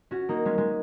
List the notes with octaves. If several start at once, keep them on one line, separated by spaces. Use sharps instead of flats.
C#4 F#4
A#3 D#4
G#3 C#4
G#3